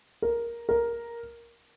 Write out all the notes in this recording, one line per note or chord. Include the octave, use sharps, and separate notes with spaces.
A#4
A#4